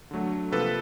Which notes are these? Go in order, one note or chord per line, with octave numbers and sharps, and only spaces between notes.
D3 F#3 A3
C3 F3 A#3 A4 B4